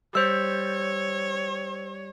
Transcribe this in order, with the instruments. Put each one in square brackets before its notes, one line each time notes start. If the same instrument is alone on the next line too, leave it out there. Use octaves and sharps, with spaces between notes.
[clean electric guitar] G3 [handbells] C5 E6 [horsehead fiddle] C#5